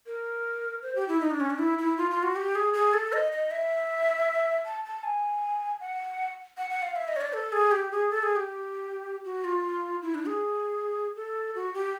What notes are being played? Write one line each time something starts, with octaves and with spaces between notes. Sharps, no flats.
A#4
C5
G4
E4
D#4
D4
C#4
D4
E4
E4
F4
F4
F#4
G4
G#4
G#4
A4
D#5
D#5
E5
A5
A5
G#5
F#5
F#5
F#5
F5
E5
D#5
C#5
D5
A4
G#4
G4
G#4
A4
G#4
G4
F#4
F4
E4
D4
G#4
A4
F#4
G4